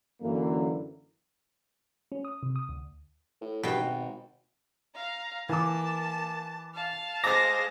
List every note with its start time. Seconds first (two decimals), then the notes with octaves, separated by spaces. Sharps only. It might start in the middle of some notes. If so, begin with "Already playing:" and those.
0.21 F#2 D3 E3 A#3
2.12 C#4
2.25 D#6
2.43 C3
2.56 D#6
2.69 D2
3.41 A2
3.63 G2 B2 G5
3.77 G#1
4.96 F5 A#5
5.49 E3 A#3 A5 D6
6.74 F5 A5
7.24 G#3 C5 D6 A6 A#6